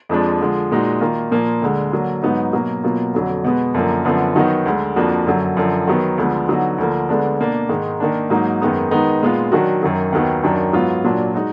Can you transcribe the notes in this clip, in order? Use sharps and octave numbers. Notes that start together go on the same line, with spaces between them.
F2 F3 G#3 D4
D3 F3 G#3
A#2 G#3 D#4 F#4
D#3 A#3 F4
A#2 F3 A#3
D2 D3 G#3
D3 F#3 A#3
G#2 F#3 B3 D#4
B2 F#3 A#3
B2 F#3 A#3 F4
F2 D3 F#3
B2 G#3 B3
F#2 D3 F3 A#3
F#2 D3 F3 B3
D#3 F#3 B3 D#4 F#4
D2 D3 G#3
F2 F3 A#3 D4 F#4
F#2 D3 F#3
F#2 D3 F3
D#3 F#3 B3
D2 D3 F3 G#3 B3
D3 F#3 B3 D#4 F#4
D2 D3 F3 A#3
D2 D3 G#3 B3 D4
B2 A#3 D4
G#2 D#3 G#3
D#3 A#3 D4
G#2 F#3 A#3 D#4
F#2 D#3 G#3 B3 D#4
D#3 G#3 B3 D#4
A#2 G#3 B3 F4
D#3 F#3 D4 F#4
F#2 D#3 F#3
D#2 D#3 F#3 B3
F#2 D#3 F#3 D4
G#2 F#3 B3 F4
A#2 F#3 D4 F4
G#3 D#4 F#4